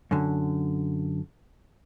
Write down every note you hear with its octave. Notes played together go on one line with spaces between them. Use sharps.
F#2 D3